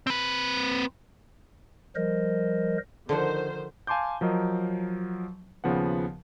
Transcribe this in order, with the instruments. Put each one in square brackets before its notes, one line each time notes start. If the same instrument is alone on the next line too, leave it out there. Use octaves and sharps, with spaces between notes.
[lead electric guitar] C4 B4
[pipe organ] F3 G3 A#4 C5 D#5
[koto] D3 F3 F#5 [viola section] D#3 C5
[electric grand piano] F5 G#5 A5 C6 D6 G6
F3 F#3 A#4 D#5
D#2 C#3 F3 B3 F#5